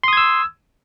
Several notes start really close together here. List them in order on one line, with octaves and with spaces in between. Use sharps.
C6 D#6 G#6 E6